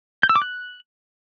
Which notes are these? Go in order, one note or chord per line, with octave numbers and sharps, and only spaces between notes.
G6
E6
D6
F#6